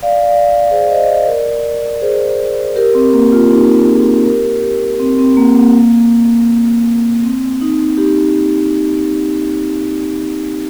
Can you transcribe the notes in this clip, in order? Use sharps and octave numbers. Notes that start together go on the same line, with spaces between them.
D5 F5
D5 F5
G#4 C5
C5 D#5
C5 D#5
A#4 D5
G#4 C5
G4 A#4
C4
A#3
F4
D#4 G4
F4 G#4
G4 A#4
G4 A#4
C4
C4
A#3
A#3
C4
D#4
D#4 G4